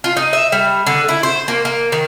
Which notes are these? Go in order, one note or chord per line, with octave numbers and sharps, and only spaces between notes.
F4
D#4
E5
G3
D3
E4
C5
A#3
A#3
D#3